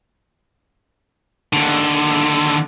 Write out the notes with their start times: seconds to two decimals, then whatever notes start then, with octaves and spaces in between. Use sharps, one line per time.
1.53 D#2 D3